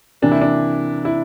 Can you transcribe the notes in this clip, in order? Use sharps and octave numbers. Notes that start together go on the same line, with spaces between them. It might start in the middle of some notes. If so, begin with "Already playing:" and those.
C3 E3 A#3 D4
E4
D4
E4